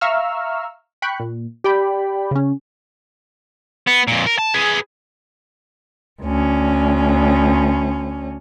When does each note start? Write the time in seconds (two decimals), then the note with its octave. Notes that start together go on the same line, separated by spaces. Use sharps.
0.01 E5 F5 A#5 C#6 E6 F6
1.02 G5 B5 C#6 F#6
1.20 A#2
1.64 G4 D5 G5 B5
2.31 C#3 C#4
3.87 B3
4.08 F2 A#2
4.26 A#4
4.38 A5
4.54 G#4 B4
6.23 D2 C#4